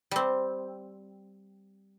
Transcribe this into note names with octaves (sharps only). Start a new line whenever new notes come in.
G3 C4